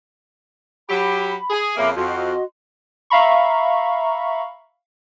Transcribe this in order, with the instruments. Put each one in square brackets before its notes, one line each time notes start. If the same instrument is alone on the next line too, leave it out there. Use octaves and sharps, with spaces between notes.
[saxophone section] F#3 G4 [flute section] B5
[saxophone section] G#4
[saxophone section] F2 C#3 A#3 [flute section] E5 B5 D6
[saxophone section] F2 [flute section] F#4 D#5 C6
[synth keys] E5 F5 A#5 B5 C#6